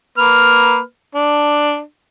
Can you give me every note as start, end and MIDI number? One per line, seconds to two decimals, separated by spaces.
0.18 0.80 58
0.18 0.80 71
0.18 0.80 89
1.15 1.79 62